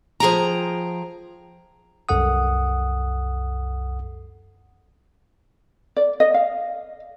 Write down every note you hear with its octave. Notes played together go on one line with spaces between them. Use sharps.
F3 G#4 G5 A#5
C2 F#2 A4 F#5 D#6
D5
D#5
F5